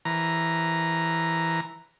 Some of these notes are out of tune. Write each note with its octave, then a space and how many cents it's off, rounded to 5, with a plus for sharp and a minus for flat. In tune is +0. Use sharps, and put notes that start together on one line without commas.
E3 +0 A#5 +0